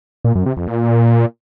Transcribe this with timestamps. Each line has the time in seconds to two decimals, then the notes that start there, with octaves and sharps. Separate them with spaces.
0.25 A#2
0.35 F#2
0.46 C3
0.57 F2
0.67 A#2